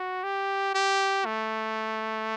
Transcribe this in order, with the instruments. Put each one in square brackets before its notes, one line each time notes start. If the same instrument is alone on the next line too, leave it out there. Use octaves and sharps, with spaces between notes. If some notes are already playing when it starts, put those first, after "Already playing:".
Already playing: [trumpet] F#4
G4
G4
A3